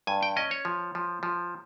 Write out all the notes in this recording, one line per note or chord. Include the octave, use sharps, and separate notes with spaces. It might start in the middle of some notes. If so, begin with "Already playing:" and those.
G2 G#5
G5
C#4 D#5
C#5
F3
F3
F3